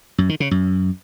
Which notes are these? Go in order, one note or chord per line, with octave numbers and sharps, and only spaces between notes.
F#2
D#3
C#3
F#2